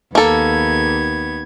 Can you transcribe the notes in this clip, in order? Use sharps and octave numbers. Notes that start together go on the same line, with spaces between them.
D#2 A#3 B3 A4 G#6